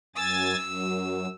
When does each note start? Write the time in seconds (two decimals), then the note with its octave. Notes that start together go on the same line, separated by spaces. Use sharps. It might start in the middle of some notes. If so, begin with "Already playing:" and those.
0.16 F#2 G#5 E6 A6
0.57 F#2